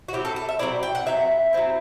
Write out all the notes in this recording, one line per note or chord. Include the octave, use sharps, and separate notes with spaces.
F#4
F#3 C4 E4 G4
A4
A4
E5
F#3 C4 E4 D5
G5
F#5
F#3 C4 E4 E5
F#3 C4 E4